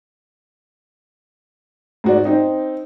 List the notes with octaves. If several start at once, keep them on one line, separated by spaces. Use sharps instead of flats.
G#2 F#4 D5
C4 D#4